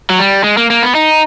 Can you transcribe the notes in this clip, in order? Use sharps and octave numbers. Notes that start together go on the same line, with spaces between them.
F#3
G3
G#3
A#3
A#3
B3
D#4